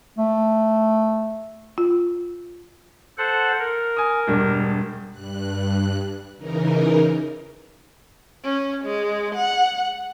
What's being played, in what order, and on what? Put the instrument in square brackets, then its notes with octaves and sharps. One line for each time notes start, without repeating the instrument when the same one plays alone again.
[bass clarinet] A3
[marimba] F4
[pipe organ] A4 C5 F#5
A#4
[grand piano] G#5 D#6
E1 G2 D4
[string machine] G2 F#6
C#3 E3 D#4 A#4
[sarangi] C#4
G#3
F#5